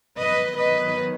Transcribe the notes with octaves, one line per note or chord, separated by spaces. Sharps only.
D#3 F#3 B3 B4 D#5
B4 D#5